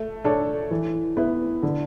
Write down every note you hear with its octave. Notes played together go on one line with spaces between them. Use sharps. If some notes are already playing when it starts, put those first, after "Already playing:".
Already playing: A3
D4 A4 C#5
E3
B3 E4
D3